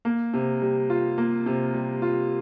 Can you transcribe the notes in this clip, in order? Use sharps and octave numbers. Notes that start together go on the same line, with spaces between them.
A#3
C3
G3
F4
A#3
C3
G3
F4